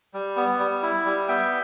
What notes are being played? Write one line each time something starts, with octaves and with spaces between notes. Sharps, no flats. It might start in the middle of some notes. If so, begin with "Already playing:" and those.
G3
B3
G3
E4
G3
B3 E5 G5